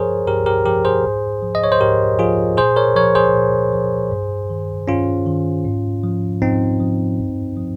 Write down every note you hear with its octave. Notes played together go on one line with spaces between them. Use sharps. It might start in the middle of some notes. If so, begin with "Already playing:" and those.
Already playing: G2 F3 G#4 A#4 C5 C#5
G2 G4 A#4
G4 A#4
F3 G4 A#4
G#4 C5
G#2
F3
D#5
C#5
C5
G#2 G4 A#4
F3 F4 G#4
A#2 G#4 C5
A#4 C#5
F3 A#4 C#5
G#4 C5
A#2
F3
G2
D#3
G2 C#4 F4
D#3
G#2
F3
G#2 C4 D#4
F3
G2
F3